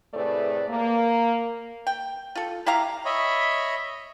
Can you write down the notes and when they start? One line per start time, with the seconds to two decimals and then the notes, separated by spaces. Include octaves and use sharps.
0.14 A2 C3 A3 G#4 B4 D5
0.69 A#3
1.87 G5
2.35 F4 A4
2.66 E4 G4 F5 A#5
3.05 C#5 D#5 E5 B5